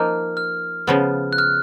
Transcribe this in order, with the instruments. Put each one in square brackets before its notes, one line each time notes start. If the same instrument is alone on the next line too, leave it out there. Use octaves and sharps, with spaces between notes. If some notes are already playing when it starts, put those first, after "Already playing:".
Already playing: [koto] F3 A#3 D#4 [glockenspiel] F6
[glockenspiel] F6
[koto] C#3 F3 B3
[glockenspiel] F#6
F6